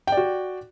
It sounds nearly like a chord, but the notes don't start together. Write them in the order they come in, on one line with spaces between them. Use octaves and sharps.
G5 D5 F#4